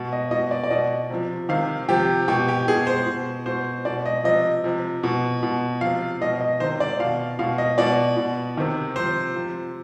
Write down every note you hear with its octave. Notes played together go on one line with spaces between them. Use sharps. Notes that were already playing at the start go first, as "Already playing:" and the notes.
Already playing: B2
D#5
B2 D#5
D5
D5
B2 D#5
C3 F3
C3 D#3 F5
C3 F3 G4
B2 G4
G4
B2 G#4
C5
B2
B2 C5
B2 D5
D#5
C3 F3 D#5
C3 F3
B2
B2
C3 F3 F5
B2 D#5
D#5
C3 D#3 C5
D5
B2 F5
B2 F5
D#5
B2 D5
B2
C3 D#3
C3 F3 C5
C3 F3